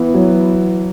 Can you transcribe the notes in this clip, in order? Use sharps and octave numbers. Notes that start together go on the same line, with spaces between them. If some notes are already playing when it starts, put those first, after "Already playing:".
Already playing: E3 B3
F#3